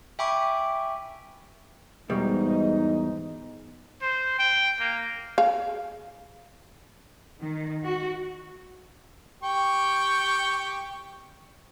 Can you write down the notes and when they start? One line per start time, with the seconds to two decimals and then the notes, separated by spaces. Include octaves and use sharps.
0.19 E5 G5 G#5 B5 C#6 D6
2.10 E2 G#2 B2 G3 D#4
4.02 C5
4.39 G5
4.80 A#3
5.38 G#4 F5
7.42 D#3
7.85 F#4
9.43 G4 G5 C#6